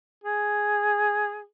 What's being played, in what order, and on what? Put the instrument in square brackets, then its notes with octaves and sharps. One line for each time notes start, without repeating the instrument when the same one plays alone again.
[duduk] G#4